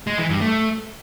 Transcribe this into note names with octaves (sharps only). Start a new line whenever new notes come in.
G#3
E3
G2
A3